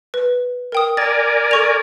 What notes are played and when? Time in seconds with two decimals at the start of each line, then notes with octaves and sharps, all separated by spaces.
0.14 B4
0.72 A#4 G5 D#6
0.97 A#4 D5 G#5 A6
1.51 A4 C#6 F7